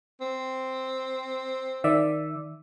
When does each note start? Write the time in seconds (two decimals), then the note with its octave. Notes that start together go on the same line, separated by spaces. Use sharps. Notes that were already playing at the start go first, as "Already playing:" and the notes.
0.21 C4
1.84 D#3 D5 E5